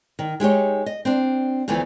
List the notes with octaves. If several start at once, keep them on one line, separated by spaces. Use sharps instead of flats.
D#3
G#3 D#4 G4 C#5
D#5
C4 D4
D2 E3 F3 A3 B3